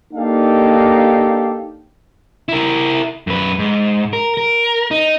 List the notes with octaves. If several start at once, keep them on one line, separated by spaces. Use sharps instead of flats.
A#3 D4 D#4 G4 A4 F5
E4 A#4
F#2 B4
G#2
A#4
A#4
D#4